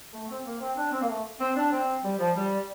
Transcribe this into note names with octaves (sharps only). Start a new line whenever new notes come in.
A3
C4
A#3
C4
D4
C4
A#3
A3
C4
D4
C4
G3
F3
G3